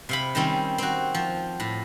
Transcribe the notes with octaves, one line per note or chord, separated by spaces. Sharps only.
C3 F5 B5
D#3 G3 C4 C#4
C4 F#4
F3
A2